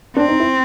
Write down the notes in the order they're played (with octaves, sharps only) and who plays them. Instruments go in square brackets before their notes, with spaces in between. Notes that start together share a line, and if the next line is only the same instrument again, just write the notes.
[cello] C4 [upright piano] D4
[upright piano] D#4
E4